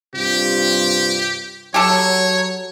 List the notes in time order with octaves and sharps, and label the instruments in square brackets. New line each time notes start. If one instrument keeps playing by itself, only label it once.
[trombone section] G2 C3 F4 [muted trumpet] G4
[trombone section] F#3 [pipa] G4 A4 [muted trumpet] C#5